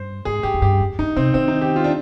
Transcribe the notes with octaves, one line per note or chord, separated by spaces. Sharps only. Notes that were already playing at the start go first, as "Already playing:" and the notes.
Already playing: G2 C5
G#2 G#4
G2 G4
F2
G2 G4
F2
G2 D#4
C3 C4
D#3 C4
D#4
G4
F4
D4